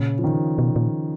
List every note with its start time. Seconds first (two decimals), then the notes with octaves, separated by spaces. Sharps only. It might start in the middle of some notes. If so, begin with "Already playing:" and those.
Already playing: A#2 C#3
0.19 F3
0.24 D#3
0.58 B2
0.76 A#2